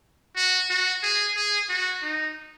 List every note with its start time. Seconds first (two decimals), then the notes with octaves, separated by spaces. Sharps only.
0.36 F#4
0.70 F#4
1.03 G#4
1.36 G#4
1.69 F#4
2.02 D#4